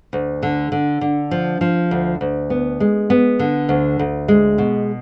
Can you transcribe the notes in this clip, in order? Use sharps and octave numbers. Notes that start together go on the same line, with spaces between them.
D2
D3
D3
D3
F3
F3
D2
D2
B3
G#3
B3
D3
D2
D2
G#3
B2